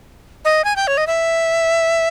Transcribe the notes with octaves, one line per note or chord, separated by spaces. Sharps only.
D#5
G#5
G5
C#5
D#5
E5